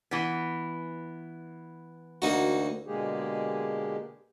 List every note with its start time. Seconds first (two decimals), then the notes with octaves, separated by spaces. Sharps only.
0.11 E3 B3
2.22 D2 A#3 D#4 F#4
2.86 B2 D3 G#3 A#3 G4 G#4